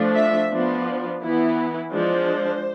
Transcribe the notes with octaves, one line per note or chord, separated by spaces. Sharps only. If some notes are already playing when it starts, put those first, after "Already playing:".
Already playing: F3 A3 D4
E5
F3 B3 D4
E3 B3 E4
F3 G#3 D4 C5